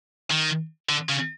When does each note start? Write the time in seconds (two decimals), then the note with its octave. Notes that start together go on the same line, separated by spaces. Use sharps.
0.30 D#3
0.89 D3
1.09 C#3